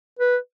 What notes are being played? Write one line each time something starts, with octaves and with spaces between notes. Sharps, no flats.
B4